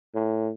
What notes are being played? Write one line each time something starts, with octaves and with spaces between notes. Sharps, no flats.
A2